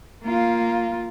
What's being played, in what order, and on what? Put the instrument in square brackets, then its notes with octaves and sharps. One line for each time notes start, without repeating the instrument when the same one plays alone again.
[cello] A#3 F4